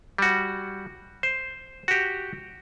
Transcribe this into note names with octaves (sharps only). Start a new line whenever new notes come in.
G3 F#4
C5
F#4 G4